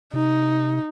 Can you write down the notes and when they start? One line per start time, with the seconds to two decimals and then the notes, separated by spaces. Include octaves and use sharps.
0.13 C3 D#4